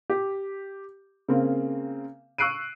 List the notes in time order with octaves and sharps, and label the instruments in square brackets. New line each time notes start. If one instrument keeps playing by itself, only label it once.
[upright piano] G4
C#3 A#3 C4
C#6 E6 F#6 C7 D7 D#7